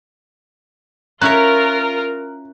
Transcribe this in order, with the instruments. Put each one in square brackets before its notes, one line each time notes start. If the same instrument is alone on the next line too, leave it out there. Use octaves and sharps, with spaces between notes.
[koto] C#4 E4 C#5 [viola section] F4 A#4 [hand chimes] A#5 F6 [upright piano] F#6